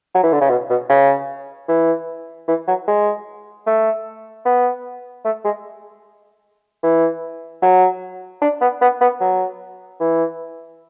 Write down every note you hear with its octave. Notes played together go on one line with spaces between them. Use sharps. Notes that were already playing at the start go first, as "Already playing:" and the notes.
F#3
E3
D3
C#3
B2
B2
C#3
E3
E3
F#3
G#3
A3
B3
A3
G#3
E3
F#3
D4
B3
B3
B3
F#3
E3